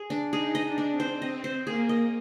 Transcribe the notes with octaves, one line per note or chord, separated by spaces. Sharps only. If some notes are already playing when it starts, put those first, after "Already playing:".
Already playing: G#4
D4
D#4 G#4
D#5
D4
D4
C4
C5
C4 D#5
C5
A#3 G#4
D#5